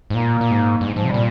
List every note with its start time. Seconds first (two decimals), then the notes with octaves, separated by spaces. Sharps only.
0.10 G#2
0.14 A#2 A#3
0.41 A#2
0.51 G#2
0.81 G2
0.86 G#2
0.96 G#2 F3
1.05 C3
1.10 A#2 G3